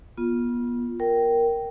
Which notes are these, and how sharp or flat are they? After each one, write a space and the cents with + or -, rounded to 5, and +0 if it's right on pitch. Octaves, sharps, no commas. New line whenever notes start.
B3 -35 F4 +0
A#4 +0 G5 -10